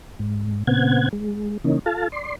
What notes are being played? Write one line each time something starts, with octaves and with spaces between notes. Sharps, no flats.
G#2
A#2 C#3 B3 C4 F#5 G#6
G#3
C#3 E3 A#3 C#4 D#4
F4 A4 F5 A5
D5 C6